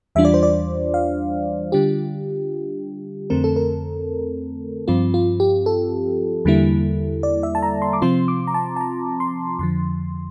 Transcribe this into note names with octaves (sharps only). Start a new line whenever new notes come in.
E2 E3 G3 D4 F4 E5
D5
C5
D5
F5
D3 G3 D4 F4 G4
F2 D3 A3 C4 A#4
A4
A#4
G2 F3 C4 F4
F4
G4
A4
E2 D3 G3 A#3 E4
D5
E5
A5
A#5
C6
D6
C3 F3 C4 F4 C6
D6
A#5
A5
A5
A#5
C6
F2 D3 F3 C6